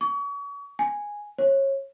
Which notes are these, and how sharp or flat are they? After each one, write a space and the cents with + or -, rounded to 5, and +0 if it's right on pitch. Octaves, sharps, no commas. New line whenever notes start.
C#6 +35
G#5 -5
C#5 -25